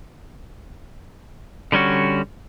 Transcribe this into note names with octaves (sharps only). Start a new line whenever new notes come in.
D3 G3 C#4 F#4